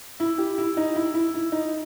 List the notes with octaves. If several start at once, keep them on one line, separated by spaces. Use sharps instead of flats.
E4
G4
E4
D#4
E4
E4
E4
D#4